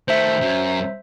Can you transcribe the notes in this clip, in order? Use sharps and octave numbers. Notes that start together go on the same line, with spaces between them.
D#3 A3 C5 E5
F#2